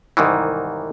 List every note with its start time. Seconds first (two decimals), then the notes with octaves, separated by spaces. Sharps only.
0.17 C2 G#2 D#3 E3